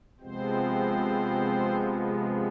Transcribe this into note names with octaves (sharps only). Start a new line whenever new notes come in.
C3 F3 G#3 B3 C4 C5